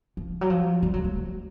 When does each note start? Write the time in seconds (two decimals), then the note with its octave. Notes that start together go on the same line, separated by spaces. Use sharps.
0.17 F3
0.41 F#3
0.50 F3
0.83 G3
0.94 F#3
1.04 A3